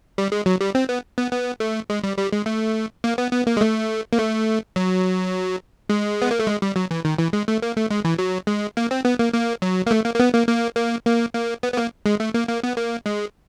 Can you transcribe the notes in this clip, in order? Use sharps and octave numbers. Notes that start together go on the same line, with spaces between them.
G3
G#3
F#3
G3
C4
B3
B3
B3
A3
G#3
G3
G3
G#3
A3
A#3
B3
B3
A#3
G#3
A3
A#3
A3
F#3
G#3
B3
A#3
A3
G#3
G3
F#3
E3
D#3
E3
G#3
A3
A#3
A3
G#3
E3
F#3
G#3
A#3
C4
B3
A#3
A#3
F#3
A#3
A3
A#3
A#3
B3
A#3
A#3
A#3
A#3
A#3
B3
B3
A#3
G#3
A3
A#3
A#3
B3
A#3
G#3